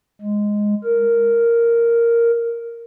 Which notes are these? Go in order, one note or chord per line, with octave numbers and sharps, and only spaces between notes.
G#3
A#4